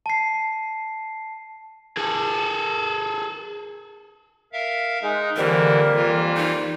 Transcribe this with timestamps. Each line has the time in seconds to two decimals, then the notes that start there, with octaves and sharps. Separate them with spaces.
0.06 A5 C7
1.97 G#4 A4
4.53 A#4 E5 F5
5.02 G#3 D#4
5.36 F2 D3 E3 G3 A#3 A#4
5.95 E3 F4
6.37 D#4